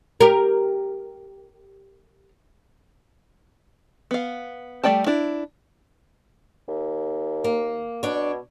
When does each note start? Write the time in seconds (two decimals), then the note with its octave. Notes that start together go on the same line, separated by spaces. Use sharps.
0.21 G4 A#4
4.11 B3 F5
4.84 G3 A3 D5 G5 A5
5.06 D4 E4
6.68 D#2
7.44 A#3
8.03 B2 D4 C#5